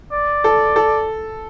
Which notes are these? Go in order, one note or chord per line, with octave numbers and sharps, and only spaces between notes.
D5
A4
A4